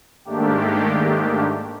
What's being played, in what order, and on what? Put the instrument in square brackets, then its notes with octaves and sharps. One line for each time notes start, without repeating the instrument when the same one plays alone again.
[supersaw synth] G#2 D#3 A3 A#3 D4 G4